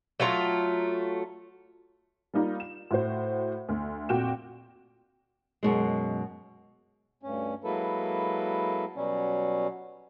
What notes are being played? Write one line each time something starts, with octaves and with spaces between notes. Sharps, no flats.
F#3 A3 F4 A#5
G3 A#3 D#4 F4
E7
A2 F#4 C5
D2
F2 A#2 F#4 G5 E7
F#2 B2 G#3
D2 G2 C#4
F#3 G#3 A#3 E4 A4 B4
B2 F#3 G3 C#4